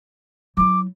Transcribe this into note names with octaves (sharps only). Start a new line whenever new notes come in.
F#3 E4 D6